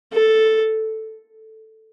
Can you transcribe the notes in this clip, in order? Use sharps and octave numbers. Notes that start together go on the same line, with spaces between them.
A4